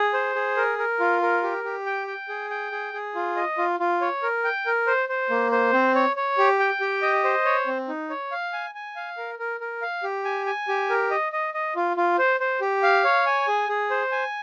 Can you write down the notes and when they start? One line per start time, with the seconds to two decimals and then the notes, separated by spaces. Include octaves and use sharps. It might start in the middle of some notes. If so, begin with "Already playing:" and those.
Already playing: G#4
0.14 C5
0.35 G#4
0.57 A#4
0.78 A#4
1.00 F4
1.22 A#4
1.43 G4
1.64 G4
1.86 G5
2.07 G5
2.29 G#4
2.50 G5
2.72 G#4
2.93 G#4
3.15 F4
3.36 D#5
3.58 F4
3.80 F4
4.01 C#5
4.23 A#4
4.44 G5
4.66 A#4
4.87 C5
5.09 C5
5.30 A#3
5.52 C5
5.73 C4
5.95 C#5
6.16 C#5
6.38 G4
6.59 G5
6.81 G4
7.02 D#5
7.24 C5
7.45 C#5
7.67 C4
7.88 D#4
8.10 C#5
8.31 F5
8.53 G#5
8.75 G#5
8.96 F5
9.17 A#4
9.39 A#4
9.60 A#4
9.82 F5
10.03 G4
10.25 G#5
10.46 G#5
10.68 G4
10.90 A#4
11.11 D#5
11.32 D#5
11.54 D#5
11.76 F4
11.97 F4
12.19 C5
12.40 C5
12.61 G4
12.83 F5
13.04 C#5
13.26 G#5
13.48 G#4
13.69 G#4
13.90 C5
14.12 G#5